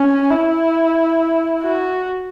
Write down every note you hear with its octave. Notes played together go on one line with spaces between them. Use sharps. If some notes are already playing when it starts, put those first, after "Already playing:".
Already playing: C#4
E4
F#4